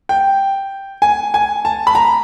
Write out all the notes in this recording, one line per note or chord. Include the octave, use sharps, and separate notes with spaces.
G5
G#5
G#5
A5
B5
A#5